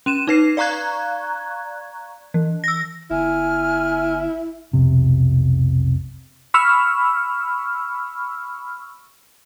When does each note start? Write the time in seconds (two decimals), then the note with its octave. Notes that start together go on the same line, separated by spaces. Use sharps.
0.06 C#4 D#7 E7
0.27 D#4 B4 C7
0.57 D5 F5 A#5 C#6 F#6 G#6
2.34 E3
2.64 E6 A#6
3.10 G1 E4 G#5 F6
4.73 F1 B1 C3
6.54 B5 C#6 E6 F6